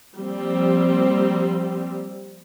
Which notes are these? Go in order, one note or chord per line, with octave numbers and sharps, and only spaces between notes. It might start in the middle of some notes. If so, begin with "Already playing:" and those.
F3 G3 A#3 C4